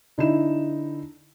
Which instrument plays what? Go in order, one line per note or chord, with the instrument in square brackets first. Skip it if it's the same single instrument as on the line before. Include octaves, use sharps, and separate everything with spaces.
[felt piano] D3 D#4 E4 E7